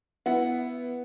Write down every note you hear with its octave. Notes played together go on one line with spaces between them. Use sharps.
B3 E4 F#5